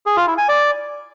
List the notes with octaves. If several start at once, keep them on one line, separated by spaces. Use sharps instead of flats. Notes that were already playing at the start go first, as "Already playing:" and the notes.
G#4
F4
E4
G#5
D5